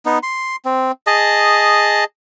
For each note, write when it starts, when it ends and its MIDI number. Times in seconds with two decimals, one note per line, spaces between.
0.05 0.19 59
0.05 0.19 63
0.23 0.56 84
0.65 0.92 60
1.07 2.04 68
1.07 2.04 75
1.07 2.04 81